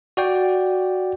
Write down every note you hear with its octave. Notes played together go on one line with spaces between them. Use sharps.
F#4 D5 G5